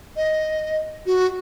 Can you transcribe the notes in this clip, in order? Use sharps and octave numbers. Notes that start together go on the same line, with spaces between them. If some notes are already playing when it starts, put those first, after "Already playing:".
D#5
F#4